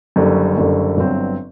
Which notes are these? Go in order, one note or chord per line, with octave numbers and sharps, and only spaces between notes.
F#1 F#2 D3 G3
F#1 F#2 D3 G3
G1 G2 F#3 C4